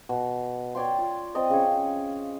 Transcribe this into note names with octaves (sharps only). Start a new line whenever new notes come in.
B2
C#5 D5 G5 C6
F4
C4 D5 D#5 A#5
C#3 C#5